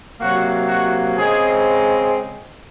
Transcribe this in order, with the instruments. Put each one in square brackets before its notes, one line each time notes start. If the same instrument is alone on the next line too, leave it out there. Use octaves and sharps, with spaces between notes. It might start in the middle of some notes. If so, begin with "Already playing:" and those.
[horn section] C3 F#3 A#3 F#4
F#4
C#3 G#3 C4 G#4